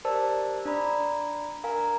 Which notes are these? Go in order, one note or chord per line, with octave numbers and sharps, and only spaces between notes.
G4 A#4 C5 D5 A5 E6
D4 D5 A#5 B5
A#4 F5 G#5 A#5